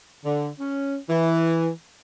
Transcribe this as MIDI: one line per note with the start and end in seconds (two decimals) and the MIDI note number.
0.25 0.49 50
0.59 0.96 61
1.09 1.69 52